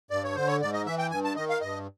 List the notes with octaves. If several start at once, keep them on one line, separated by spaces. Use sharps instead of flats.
G2 D5
C#5
D3 C5
C#5
G#2 D5
D#5
E3 E5
G5
G2 G#5
A5
D#3 D#5
F5
G2 D#5